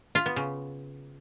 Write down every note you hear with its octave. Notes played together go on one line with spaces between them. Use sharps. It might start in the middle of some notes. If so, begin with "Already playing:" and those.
F4
B3
C#3